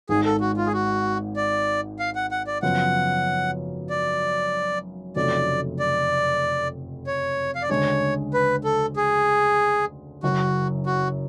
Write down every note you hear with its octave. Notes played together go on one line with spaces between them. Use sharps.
G#1 G#2 G#3 G#4
A4
F#4
F4
G#4
F#4
D5
F5
F#5
F#5
D5
F#2 C#3 F3 B3 F4 F#5
D5
F1 F2 C#3 F#3 A3 D5
D5
C#5
F5
D5
D2 C#3 G#3 D4 C#5
B4
A4
G#4
F#1 F#2 C#3 F#4
F#4